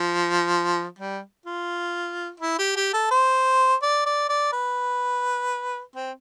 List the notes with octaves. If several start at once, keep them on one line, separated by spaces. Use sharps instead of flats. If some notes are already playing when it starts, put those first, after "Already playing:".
Already playing: F3
G3
F4
E4
G4
G4
A4
C5
D5
D5
D5
B4
C4